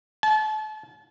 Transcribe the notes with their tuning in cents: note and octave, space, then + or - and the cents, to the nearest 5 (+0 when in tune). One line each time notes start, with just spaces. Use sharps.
A5 -35